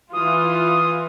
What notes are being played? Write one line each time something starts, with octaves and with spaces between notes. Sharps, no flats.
E3 F4 D#6